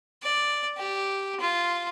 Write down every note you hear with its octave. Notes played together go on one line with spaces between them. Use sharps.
D5
G4
F4